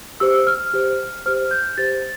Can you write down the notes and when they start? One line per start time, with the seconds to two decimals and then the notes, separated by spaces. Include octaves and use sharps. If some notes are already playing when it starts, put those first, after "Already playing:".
0.20 G4 C5 E6
0.47 F6
0.74 G4 C5
1.26 G4 C5 F6
1.51 G6
1.78 G4 C5 A6